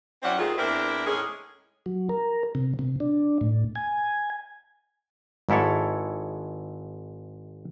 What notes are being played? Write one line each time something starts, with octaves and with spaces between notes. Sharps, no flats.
F#3 C4 C#4 E4 D5 F#5
D#2 D#3 A3 C4 F4 G#4
E2 C4 D4 E4 A#4
A2 G#3 C#4 D#4 G#4
F#3
A#4
C3
C3
D4
A2
G#5
G#1 G#2 E4 A4 C#5